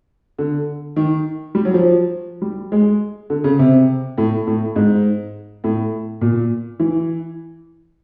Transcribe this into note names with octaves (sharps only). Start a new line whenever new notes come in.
D3
D#3
G3
F#3
F3
G3
G#3
D3
C#3
C3
A2
A2
G#2
A2
A#2
E3